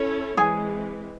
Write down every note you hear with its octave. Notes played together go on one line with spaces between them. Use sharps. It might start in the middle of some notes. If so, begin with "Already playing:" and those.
Already playing: C#4 E4 A4 C#5
E3 G#3 C4 G#4 G#5